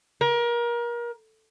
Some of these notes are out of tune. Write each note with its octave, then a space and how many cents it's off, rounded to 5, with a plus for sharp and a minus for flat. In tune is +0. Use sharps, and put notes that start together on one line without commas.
A#4 +30